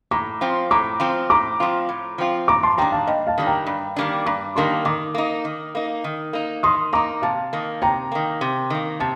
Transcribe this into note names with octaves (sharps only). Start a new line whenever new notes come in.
A2 A#5 D6
F3 C4 F4
A2 A#5 D6
F3 C4 F4
A2 A#5 D6
F3 C4 F4
A2
F3 C4 F4
G2 A#5 D6
A5 C6
D#3 G3 A#3 D4 G5 A#5
F5 A5
G2 D#5 G5
F5 A5
D#3 G3 A#3 D4
G5 A#5
G2
D#3 G3 A#3 D4
G2 A#5 D6
D#3 G3 A#3 D4 A5 C6
D#3 A#5 D6
A#3 D#4
D#3
A#3 D#4
D#3
A#3 D#4
D#3 C6 D#6
A#3 D#4 A#5 D6
C3 F5 A5
D#3 A#3
C3 G5 A#5
D#3 A#3
C3
D#3 A#3
C3 A5